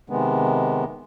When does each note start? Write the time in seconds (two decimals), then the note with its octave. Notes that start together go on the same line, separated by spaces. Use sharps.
0.10 C3 D#3 G#3 B3